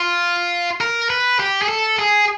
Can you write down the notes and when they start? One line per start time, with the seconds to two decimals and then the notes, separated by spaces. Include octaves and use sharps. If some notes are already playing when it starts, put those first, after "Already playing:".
Already playing: F4
0.81 A#4
1.10 B4
1.40 G4
1.62 G#4
1.69 A4
1.99 G#4